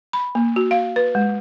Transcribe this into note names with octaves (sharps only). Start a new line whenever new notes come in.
B5
A#3
F#4
F5
B4
G#3